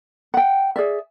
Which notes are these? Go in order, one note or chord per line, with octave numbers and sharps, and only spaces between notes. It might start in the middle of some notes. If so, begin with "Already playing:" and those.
F#5 G5
G#4 D5 E5